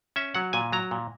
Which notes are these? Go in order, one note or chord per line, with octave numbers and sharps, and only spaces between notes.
C#4 E5
F#3 F#5
A#2 G#5
F#3 A#5
A#2